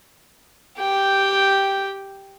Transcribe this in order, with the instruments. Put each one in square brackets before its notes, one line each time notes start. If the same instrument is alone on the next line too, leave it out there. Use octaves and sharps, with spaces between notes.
[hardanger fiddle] G4 G5